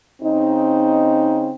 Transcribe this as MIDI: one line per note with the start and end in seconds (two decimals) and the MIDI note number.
0.22 1.53 49
0.22 1.53 60
0.22 1.53 63